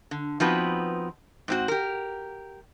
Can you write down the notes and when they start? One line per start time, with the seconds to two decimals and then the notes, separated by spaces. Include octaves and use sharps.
0.11 D3
0.40 F3 B3 C4 D#4 F#4 B4
1.48 G#2 C4 F#4
1.68 G4 A#4